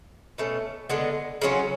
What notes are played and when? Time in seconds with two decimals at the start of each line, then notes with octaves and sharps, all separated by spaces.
0.38 B2 A3 C#4
0.89 D3 G#3 B3
1.42 C#3 F#3 C#4 F4